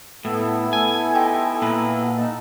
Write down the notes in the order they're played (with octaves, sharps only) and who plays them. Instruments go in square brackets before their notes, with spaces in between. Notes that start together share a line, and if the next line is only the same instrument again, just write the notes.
[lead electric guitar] A2 [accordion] B3 E4 A4
[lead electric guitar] G#5
[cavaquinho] D#4 G4 C6
[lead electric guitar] A#2 [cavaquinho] B4 A#5
[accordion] D#4 A5